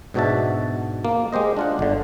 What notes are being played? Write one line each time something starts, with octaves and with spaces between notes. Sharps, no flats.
G#2 B2 D4 F#4 E5 A5
A#3
G#3 G4 C5 D#5
D4 F4 F#5
G1 D3